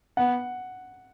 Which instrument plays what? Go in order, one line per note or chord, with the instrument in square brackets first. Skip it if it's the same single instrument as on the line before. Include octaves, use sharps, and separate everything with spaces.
[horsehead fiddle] B3 [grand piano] F#5